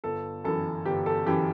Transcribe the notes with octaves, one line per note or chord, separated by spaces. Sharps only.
G1 A4
F#2 E3 A4
G1 G4
A4
F#2 E3 G4